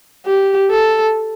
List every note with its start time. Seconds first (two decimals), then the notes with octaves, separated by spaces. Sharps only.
0.26 G4
0.70 A4